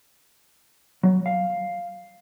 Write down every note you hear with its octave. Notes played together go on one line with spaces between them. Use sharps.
F#3
F5